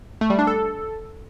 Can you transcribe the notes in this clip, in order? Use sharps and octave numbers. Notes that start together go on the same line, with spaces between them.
A3
G3
D4
A4